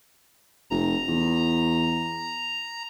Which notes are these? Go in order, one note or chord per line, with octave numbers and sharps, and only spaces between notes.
F1 A#5
E2